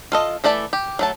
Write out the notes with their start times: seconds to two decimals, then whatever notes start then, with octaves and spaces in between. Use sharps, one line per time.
0.12 F4 A4 D#5
0.44 E3 A3 D5 A5 B5
0.73 G4
0.99 F#3 A3 A5